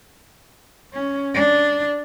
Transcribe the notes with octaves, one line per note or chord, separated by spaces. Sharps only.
C#4
D4